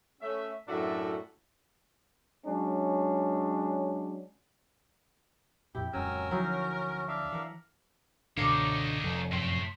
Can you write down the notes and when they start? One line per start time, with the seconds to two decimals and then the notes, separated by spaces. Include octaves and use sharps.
0.22 A3 C#4 E5
0.68 F#2 A2 D4 F#4 A4 E5
2.46 F#3 G#3 C#4 D4
5.75 F2 A#2 E4 G4
5.93 D1 F2 C#3 F#3 G#3 A#4 G#5 E6
6.31 D2 F3 F#3 C#4 D#4 E4 F#4
7.08 D4 E5 F5
7.32 E3 A#4 F#5
8.37 C#2 G#2 B2 D3 D#4 C#5 D5 F5
9.04 F1 A4
9.33 F#2 A2 A3 C5